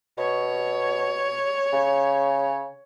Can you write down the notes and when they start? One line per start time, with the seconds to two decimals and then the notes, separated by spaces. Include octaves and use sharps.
0.18 B2 C#5
1.72 C#3